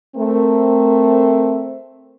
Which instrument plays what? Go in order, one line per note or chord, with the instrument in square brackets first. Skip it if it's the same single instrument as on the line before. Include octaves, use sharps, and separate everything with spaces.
[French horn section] A3 C4 A#4